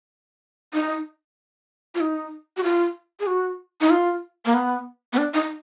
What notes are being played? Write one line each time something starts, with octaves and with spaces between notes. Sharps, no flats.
D#4
F4
D#4
F#4
F4
G#4
F#4
D#4
F4
A#3
B3
B3
D4
D#4